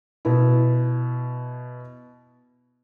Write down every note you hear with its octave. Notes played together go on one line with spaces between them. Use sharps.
B2 B3 E4